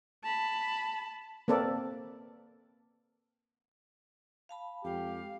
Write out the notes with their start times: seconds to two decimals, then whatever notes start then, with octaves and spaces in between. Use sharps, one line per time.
0.23 A5 B5
1.48 A#3 C4 A4 B4 D5
4.49 F5 A5 B5
4.84 F2 G#3 G4 F5 G5